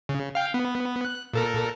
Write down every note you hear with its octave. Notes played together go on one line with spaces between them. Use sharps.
C#3
F5 G5
B3
F#6
A#2 A4 A#4